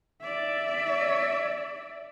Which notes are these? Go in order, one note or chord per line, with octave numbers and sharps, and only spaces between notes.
D5 E5